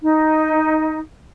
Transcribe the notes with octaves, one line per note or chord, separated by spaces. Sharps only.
D#4